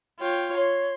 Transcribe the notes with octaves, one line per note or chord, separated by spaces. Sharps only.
F4 C#5 G5
C#5 C6